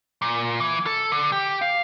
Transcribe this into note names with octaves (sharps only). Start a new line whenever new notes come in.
A#2
E3
A4
D3
G4
F5